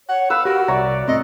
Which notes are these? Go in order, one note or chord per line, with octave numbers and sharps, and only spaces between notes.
C#5 F#5
B4 F5 E6
F#4 G4 A#4
C2 C#5 D5 E5 A#5
A2 C4 A4 D#5